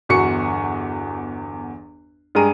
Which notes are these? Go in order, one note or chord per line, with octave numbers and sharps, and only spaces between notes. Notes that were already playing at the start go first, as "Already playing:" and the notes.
G1 E2 F#4 C#6 C#7
G2 G#3 G#4 A#5 D#7